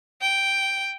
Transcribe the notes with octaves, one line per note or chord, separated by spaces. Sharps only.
G5